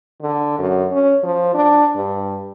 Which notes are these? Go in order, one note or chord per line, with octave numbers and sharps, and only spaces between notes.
D3
F#2
C#4
F3
D4
G2